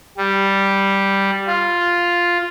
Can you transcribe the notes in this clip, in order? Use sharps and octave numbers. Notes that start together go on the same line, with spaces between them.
G3
F4